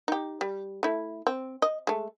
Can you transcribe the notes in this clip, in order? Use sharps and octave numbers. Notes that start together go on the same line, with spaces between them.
D#4 G4
G3
A3 E4
C4
D#5
G#3 A3